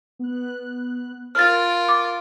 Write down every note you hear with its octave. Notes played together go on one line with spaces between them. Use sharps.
B3 F#6
F4 A#4 F6 A6 D7
D6 A6